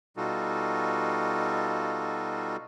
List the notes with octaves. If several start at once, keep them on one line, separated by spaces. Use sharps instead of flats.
B2 G3 D#4 F4 F#4 A4